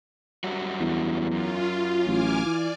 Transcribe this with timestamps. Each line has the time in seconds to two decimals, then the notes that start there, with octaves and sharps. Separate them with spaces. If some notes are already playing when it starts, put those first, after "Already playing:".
0.44 F#2 G3 F#4
0.80 E2
1.31 F#2 F4
2.07 A1 G#5 D6 F6
2.45 E3 D5